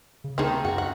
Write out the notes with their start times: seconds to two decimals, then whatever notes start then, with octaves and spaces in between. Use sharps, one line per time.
0.24 C#3
0.38 D2 D#3 C4 D#4 G#4 A5
0.65 F#2 F#4
0.78 F#5